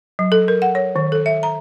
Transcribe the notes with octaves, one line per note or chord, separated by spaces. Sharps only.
F#3
A4
A#4
F#5
C#5
D#3
A4
E5
A#5